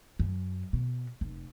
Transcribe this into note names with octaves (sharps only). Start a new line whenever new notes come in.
F#2
B2
F1